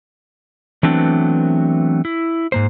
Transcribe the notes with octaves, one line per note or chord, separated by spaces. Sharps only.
E3 F#3 A3 B3 C4 D4
E4
G#2 A#3 C5